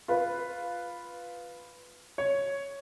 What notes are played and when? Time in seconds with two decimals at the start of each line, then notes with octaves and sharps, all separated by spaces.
0.08 F4 B4
2.18 C#5